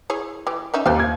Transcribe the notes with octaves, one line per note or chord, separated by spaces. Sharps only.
E4 G#4 C#5
E3 G4
C#4 D#4 E5
D#2 B4 C5 F5
G#6